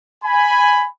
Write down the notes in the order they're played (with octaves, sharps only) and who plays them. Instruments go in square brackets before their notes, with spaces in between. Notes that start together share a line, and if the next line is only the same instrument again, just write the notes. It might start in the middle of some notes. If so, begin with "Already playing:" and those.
[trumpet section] G#5 B5